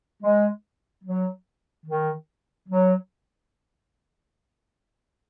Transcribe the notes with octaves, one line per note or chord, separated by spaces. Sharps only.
G#3
F#3
D#3
F#3